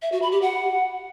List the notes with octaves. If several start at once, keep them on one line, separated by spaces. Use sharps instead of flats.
E5
F#4
B5
G4
F#5